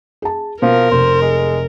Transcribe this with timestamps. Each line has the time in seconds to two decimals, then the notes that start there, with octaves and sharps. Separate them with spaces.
0.22 G#4 A5
0.62 B2 F3 A#4
0.91 F1 C5
1.22 G#3